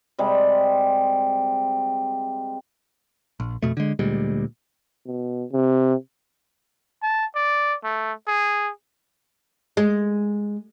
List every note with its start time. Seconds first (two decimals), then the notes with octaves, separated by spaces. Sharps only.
0.18 C3 G3 G#3
3.40 A#1
3.62 F2 B2 A3
3.77 D3 G#3
3.99 D2 A#2 G3 G#3
5.06 B2
5.53 C3
7.03 A5
7.35 D5
7.84 A3
8.28 G#4
9.77 G#3